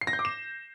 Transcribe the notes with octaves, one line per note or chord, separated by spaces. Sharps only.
C7
A#6
G6
D6
E7